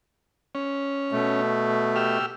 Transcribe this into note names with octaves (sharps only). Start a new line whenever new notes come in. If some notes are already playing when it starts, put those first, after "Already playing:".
C#4
B2 A3
G4 E6 F6